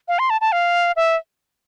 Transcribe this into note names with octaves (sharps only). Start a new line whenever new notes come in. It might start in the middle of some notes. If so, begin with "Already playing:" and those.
F5
C6
A5
A5
F5
E5